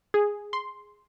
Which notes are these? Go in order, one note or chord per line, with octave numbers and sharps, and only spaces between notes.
G#4
C6